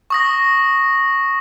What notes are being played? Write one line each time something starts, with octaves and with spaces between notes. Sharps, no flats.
C#6 D#6 A#6